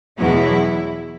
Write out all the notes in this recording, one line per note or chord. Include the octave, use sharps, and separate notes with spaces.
E2 B2 F#3 E4